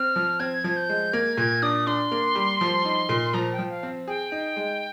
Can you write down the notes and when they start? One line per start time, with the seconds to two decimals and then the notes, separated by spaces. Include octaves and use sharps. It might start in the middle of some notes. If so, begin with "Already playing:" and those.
Already playing: C4 F6
0.16 F3
0.40 C4 G#6
0.64 F3
0.77 G6
0.89 G#3
1.13 A#3 G#6
1.37 A#2 G#6
1.62 D4 D#6
1.87 D4 C6
2.12 A#3
2.35 G3
2.61 F3
2.85 D#4
3.09 A#2
3.34 F3 A#5
3.52 G5
3.59 F3
3.70 F5
3.83 C4
4.07 G#4 G5
4.32 D#4
4.56 G#3